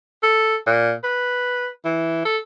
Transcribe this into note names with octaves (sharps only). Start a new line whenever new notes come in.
A4
A#2
B4
E3
A4